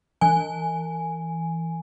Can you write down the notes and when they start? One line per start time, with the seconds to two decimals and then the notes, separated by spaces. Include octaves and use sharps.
0.21 E3 G#5